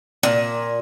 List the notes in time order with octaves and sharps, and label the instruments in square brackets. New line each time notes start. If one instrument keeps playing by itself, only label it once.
[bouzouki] A#2